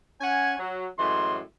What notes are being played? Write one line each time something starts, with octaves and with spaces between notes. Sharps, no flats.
C#4 F#5 G#5
F#3
F#2 A2 E3 G#3 C6